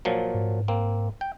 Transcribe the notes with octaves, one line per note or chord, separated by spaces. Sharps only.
A#2 F3 F#3
G#2
A#3 C4
G5